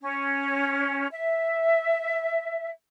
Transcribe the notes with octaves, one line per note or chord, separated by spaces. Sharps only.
C#4
E5